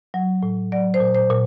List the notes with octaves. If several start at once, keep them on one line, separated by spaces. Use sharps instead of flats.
F#3
A2
F#3 D5
C5
A#2
C5
A#2